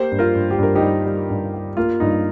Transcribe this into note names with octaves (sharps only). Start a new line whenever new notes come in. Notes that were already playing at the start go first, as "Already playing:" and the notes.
Already playing: A#3 G4 C5
G2
F4 A#4
G2
G4
G2 A#4
D#4 G4
G3
G3
G2
G3
A#3 F4
G2 D#4